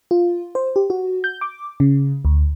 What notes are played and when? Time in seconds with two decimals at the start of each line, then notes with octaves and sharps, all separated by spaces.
0.11 F4
0.55 C5
0.76 G4
0.90 F#4
1.24 G6
1.41 D6
1.80 C#3
2.25 D2